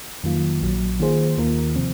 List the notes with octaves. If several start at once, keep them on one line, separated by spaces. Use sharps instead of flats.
F2 D#3 F#3 A#3 F4
A#1 A#2 F#3
D#3 A#3 F4 G#4 C5
D#2 D#3 A#3 F4 A#4
C3 F3 C4